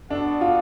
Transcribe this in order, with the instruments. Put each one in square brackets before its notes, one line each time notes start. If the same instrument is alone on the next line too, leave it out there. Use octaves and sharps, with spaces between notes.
[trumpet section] B3 F#4 A4 D5 F#5 [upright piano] D4
[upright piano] F4